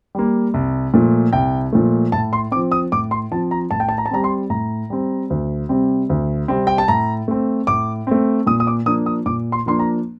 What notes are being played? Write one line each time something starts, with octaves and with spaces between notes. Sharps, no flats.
G3 A#3
C2
A#2 F3 A3
C2 G5
A#2 F3 A3
A2 A5
C6
F3 C4 D6
D#6
A2 D6
C6
F3 C4 A5
A#5
A2 A5
G5
A5
A#5
A5
G3 C4 A#5
C6
A2 A#5
G3 C4
D2
C3 G3 C4
D2
C3 G3 C4
G5
A5
A2 A#5
A3 C4
A2 D6
A3 C4
A#2 D#6
D#6
D6
F3 A#3 D4 D#6
D#6
A#2 D6
C6
F3 A#3 D4 C6
A#5